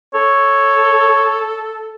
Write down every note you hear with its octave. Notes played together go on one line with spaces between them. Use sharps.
A4 C#5